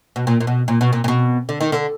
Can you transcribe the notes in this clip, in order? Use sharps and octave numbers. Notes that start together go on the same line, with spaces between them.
B2
A#2
A#2
B2
A#2
B2
A#2
A#2
B2
D3
D#3
D3